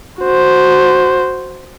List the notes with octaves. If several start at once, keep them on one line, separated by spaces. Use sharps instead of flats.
F#4 C5